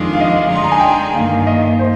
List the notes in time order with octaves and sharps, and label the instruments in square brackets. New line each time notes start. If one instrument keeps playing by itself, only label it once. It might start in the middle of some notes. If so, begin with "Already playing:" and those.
Already playing: [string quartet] F2 D#3 G#3 D4 F4
[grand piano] F5
D#5
F5
[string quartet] D3 G#3 D#4 G#4
[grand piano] C6
A#5
G#5
G5
[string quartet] G2 D#3 A#3 [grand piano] F5
[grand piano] F5
D#5
C5